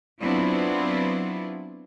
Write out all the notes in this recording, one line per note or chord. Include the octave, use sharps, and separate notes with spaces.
F#3 B3 C4 D4 E4 F4